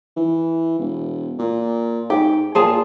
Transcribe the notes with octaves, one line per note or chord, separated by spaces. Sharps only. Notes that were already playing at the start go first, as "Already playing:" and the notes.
E3
E1
A#2
G#2 G4
A#2 F4 G#4 A5